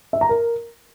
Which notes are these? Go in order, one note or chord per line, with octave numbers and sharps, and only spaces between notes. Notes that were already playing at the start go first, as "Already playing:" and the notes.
E5
A#5
A#4